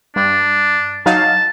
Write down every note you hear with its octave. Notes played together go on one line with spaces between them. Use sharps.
G2 D4
F#3 D#4 F5 A5